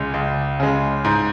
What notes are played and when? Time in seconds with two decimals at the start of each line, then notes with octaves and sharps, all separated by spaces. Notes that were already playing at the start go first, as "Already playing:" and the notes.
Already playing: C#2 C#3 G#3
0.14 C#2
0.60 C#3 G#3
1.05 G#2